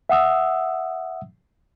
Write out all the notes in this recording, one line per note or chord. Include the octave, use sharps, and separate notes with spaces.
E5 F#5 D#6 E6